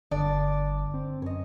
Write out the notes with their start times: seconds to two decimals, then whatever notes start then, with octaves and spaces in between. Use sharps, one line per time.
0.11 G1 G2 D3 D4 D5
0.94 C4
1.22 F#2 C#5 D#5